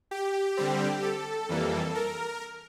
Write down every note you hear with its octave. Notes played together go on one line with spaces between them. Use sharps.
G4
D3 G3 C4
A4
F2 E3 G3 A#3
A#4